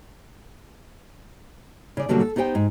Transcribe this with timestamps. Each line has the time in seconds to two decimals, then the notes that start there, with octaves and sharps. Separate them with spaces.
1.97 C#3 D5
2.09 B2 D3 F#3 G3 A#3 F#4
2.21 A4
2.36 B3 D#4 G4 C5 G5
2.55 G#2